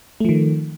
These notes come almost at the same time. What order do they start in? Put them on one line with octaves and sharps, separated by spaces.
A3 F3 D#3